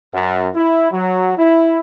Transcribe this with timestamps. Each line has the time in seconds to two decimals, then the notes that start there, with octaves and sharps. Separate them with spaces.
0.13 F#2
0.53 E4
0.91 F#3
1.36 E4